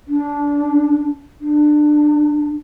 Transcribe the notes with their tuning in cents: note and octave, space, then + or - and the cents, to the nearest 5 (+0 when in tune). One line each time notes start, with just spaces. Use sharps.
D4 -20
D4 +20